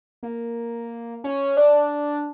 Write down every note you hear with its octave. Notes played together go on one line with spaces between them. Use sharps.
A#3
C#4
D4